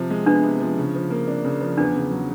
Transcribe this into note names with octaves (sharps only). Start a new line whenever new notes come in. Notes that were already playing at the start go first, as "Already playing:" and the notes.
Already playing: C3 F3
G#3
B3 D4
C3
F3
C#3
F3
A#3
D4
C#3
F3
E2 D4
C#3
F#3